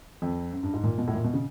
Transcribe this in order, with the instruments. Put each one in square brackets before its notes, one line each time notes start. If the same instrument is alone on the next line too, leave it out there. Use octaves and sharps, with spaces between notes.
[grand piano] F2
F#2
G2
G#2
A#2
B2
A2
A#2
B2
C#3